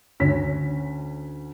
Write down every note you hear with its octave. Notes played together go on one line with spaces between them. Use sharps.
D2 C#4 C#5 B6